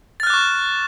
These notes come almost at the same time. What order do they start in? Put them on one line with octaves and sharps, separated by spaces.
A6 F6 F#6 D6 C#6